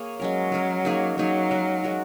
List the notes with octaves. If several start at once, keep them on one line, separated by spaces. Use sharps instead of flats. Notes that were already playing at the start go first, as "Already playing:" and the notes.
Already playing: A#3 G#4 C#5
F#3 G#3 C#4 A#4
G#3 C#4 A#4
A#3 D#4 G#4 C#5
F#3 A#3 D#4 G#4 C#5
G#3 F#4 A#4
G#3 F#4 A#4